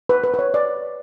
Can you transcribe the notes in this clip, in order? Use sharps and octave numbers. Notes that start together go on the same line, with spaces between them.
B4
B4
B4
C#5
D5